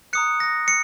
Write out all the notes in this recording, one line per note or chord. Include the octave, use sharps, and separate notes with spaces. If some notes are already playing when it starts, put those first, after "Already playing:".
A#5 D#6 F#6 C#7
A#6
C#7